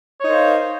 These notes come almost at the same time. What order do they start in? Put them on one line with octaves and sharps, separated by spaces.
C#5 D#4 A#4 C5 F5